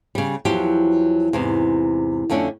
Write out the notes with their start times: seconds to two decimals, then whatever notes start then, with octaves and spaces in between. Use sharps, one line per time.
0.15 C#3 G3
0.45 E2 F3 F#3 G4
1.33 E2 G#2 C3
2.30 F2 D3 A3 C#4 D4